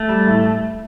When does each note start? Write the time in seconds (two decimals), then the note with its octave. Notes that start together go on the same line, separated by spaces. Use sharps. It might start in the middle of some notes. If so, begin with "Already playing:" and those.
Already playing: A3
0.09 G3
0.27 A2